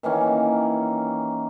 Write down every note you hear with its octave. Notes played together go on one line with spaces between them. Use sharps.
D#3 E3 A#3 C#4